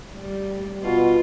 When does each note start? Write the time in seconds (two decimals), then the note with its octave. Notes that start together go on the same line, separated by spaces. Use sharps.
0.12 G3
0.82 B2 F4